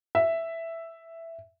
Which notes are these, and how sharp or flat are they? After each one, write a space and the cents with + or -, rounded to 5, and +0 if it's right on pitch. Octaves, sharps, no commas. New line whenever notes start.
E5 +5